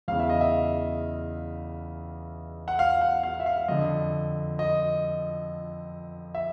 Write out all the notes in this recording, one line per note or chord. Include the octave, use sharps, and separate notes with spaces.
E2 C#3 E3 F5
E5
D#5
E5
F#5
F5
F#5
F5
E5
F5
F2 D3 D#5
D#5
E5